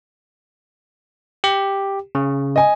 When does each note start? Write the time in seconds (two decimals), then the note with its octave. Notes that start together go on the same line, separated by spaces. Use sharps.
1.44 G4
2.15 C#3
2.56 D#5 G#5